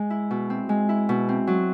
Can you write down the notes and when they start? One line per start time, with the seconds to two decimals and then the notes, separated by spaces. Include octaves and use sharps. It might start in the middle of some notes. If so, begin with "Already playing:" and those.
Already playing: G#3
0.10 E4
0.31 B2
0.50 C4
0.69 G#3
0.89 E4
1.09 B2
1.29 C4
1.47 F#3